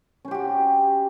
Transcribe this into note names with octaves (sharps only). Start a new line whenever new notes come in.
C#4 F#4 G4 C5